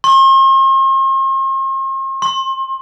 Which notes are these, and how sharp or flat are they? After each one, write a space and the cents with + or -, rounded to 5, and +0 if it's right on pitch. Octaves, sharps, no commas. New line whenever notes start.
C6 +45
C6 +30